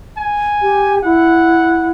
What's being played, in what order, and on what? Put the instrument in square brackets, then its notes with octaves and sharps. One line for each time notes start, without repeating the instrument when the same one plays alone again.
[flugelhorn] G#5
[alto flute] G4
[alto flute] E4 [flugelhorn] F#5